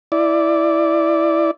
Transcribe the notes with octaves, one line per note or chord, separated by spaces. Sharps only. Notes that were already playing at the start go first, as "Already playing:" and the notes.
E4 D5